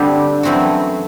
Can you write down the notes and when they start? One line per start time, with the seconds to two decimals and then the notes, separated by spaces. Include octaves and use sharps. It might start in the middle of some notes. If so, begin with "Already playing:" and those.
Already playing: D3 G3 A3 C4 G4
0.43 F#2 E3 A3 C4 F#4